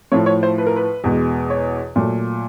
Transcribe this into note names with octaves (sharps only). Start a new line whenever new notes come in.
A2 F3 A3 C#5
C#5
C5
B4
A#4
B4
E2 B2 G#3
C#5
A#2 F#3 A3